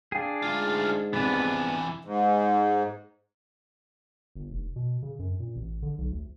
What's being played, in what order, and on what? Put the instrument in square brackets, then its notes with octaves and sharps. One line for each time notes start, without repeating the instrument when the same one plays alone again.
[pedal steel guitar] D4 G#4 [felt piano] F5 G5
[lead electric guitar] D2 F4 [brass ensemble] G#2
[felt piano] C2 F2 C3 [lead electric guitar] E3 D4 [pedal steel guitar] B3 B4
[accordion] G#2
[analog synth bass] G1
F1
B2
C#3
F#2
A#2
A1
D3
B1
D2